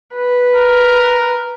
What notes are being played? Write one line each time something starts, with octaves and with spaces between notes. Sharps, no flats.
B4
A#4